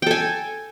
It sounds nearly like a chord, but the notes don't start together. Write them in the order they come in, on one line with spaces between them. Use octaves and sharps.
G5 A4 G#5